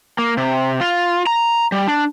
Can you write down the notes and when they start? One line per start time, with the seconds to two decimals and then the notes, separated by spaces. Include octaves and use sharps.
0.19 A#3
0.37 C3
0.80 F4
1.27 A#5
1.72 G3
1.88 D4